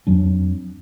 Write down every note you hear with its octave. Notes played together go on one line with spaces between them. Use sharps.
F2 F#3 D4